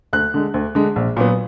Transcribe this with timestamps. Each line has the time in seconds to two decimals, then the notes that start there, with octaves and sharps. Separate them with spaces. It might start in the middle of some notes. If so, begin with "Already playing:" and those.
0.13 D2 F#6
0.34 D3 G#3
0.54 D2
0.75 D3 G#3
0.96 A#1
1.17 A#2 F#3 B3